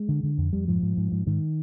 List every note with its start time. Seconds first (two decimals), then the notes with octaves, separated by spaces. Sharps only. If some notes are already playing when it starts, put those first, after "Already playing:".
Already playing: G#3
0.09 D3
0.23 D3
0.38 F2
0.53 F2 G3
0.67 G#2 F3
0.82 G#2
0.97 G#2
1.12 G#2
1.27 G#2 D#3